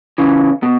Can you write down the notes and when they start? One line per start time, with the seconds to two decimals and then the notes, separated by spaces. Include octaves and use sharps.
0.18 C#3 E3
0.63 B2